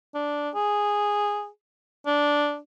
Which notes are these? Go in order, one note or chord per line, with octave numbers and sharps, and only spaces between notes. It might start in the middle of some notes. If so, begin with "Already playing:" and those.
D4
G#4
D4